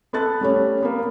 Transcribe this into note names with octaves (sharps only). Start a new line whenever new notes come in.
B3 A4 F#6 A6
G3 A3 C#4
A#3 B3